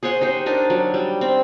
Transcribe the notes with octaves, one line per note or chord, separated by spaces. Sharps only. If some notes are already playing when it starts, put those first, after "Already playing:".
G#4 C5 C#5 F#5
D#4 G4 C5
D4 D#4 A#4
F#3
G3
C4